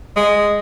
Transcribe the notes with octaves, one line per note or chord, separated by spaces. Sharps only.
G#3